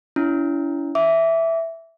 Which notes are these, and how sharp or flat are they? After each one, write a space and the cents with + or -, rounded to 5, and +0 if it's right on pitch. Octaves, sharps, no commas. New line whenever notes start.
C#4 +40 E4 +10
E5 +0 D6 -25